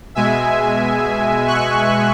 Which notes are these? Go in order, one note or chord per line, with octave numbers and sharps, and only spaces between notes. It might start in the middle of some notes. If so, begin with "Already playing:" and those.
B2 G#3 E5 G#5
C#6 F#6